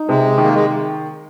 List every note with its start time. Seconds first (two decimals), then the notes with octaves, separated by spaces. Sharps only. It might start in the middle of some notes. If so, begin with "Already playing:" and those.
Already playing: D#4
0.09 C3 G#3
0.38 D#3
0.43 A#3
0.54 G#3